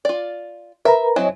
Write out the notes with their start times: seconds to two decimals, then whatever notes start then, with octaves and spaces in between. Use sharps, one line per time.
0.05 F4 D5
0.85 A#4 B4 E5 A#5
1.16 F#3 C4 E4 C#5 D#5 G#5